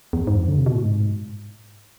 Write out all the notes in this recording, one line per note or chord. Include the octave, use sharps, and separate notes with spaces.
E2
G#2
F2
D3
C3
B2
A2
G#2